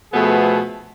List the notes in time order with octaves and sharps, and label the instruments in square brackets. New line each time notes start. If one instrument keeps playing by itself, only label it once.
[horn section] B2 F3 A3 B3 G#4 A4